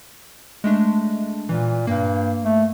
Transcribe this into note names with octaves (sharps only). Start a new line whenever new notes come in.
G#3 A3 D4
A#2 E3
G2 A#3
A3